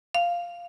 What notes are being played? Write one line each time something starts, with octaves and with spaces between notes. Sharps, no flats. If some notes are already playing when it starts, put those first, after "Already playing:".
F5